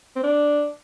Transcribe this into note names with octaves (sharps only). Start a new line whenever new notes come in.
C4
D4